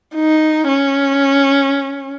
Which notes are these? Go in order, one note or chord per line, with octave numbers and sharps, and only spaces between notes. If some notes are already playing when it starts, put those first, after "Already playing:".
D#4
C#4